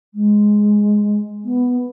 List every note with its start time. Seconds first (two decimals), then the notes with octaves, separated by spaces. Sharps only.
0.14 G#3
1.45 B3